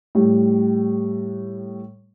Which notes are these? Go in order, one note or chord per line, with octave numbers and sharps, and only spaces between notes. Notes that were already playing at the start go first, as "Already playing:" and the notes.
A2 G3